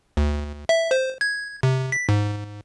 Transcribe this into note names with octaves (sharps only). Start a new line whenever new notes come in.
D2
E5
C5
G#6
C3
B6
G#2